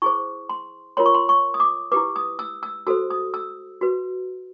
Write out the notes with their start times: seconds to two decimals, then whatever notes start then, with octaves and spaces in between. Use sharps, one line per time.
0.02 E4 G#4 C5 C#6
0.49 C6
0.97 F4 A#4 C#5 C6
1.06 C#6
1.14 C6
1.29 C#6
1.54 D#6
1.60 D6
1.92 E4 G4 B4 D6
2.16 D#6
2.39 E6
2.63 E6
2.87 F#4 A4 C5 E6
3.10 D#6
3.34 E6
3.81 F#4 B4